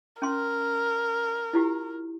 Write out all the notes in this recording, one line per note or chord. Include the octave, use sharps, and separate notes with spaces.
C#4 A#4 C6
E4 F4 G4